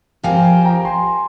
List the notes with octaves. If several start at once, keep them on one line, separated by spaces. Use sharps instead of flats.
F3 C4 G4 A#4 F5 G#5
F5 G#5
G5 A#5
G#5 C6